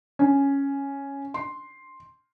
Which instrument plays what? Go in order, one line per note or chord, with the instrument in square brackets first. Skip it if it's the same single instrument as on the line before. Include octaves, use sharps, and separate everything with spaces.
[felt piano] C#4
C6